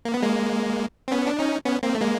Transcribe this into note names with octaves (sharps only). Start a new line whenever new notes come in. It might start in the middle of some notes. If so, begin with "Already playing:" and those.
A#3
B3
G#3 A#3
C4
B3 C#4
D4
C#4 D#4
B3 C#4
A#3 C4
A3
G#3 A#3